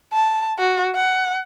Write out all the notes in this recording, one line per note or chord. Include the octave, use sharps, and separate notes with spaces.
A5
F#4
F#5